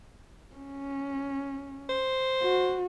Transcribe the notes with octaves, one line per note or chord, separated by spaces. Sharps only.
C#4
C5
F#4